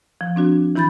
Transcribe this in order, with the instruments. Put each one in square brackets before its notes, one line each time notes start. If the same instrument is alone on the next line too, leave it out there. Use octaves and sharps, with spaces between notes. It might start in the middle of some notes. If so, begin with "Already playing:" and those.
[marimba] F3
C4 D4 F#4
E3 E4 B5 G6 A6